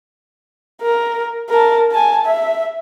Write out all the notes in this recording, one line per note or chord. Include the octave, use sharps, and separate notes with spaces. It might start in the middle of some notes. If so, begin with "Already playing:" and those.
A#4
A#4 A5
G#5 A5
E5